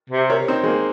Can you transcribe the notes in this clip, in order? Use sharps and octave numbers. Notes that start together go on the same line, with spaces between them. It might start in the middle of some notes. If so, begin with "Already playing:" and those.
C3
A#4 C#5
C4 D#4
G#3
A#3